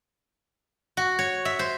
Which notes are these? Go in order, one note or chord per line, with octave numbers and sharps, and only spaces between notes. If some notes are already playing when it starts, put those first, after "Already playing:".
F#4
C#5
E5
C5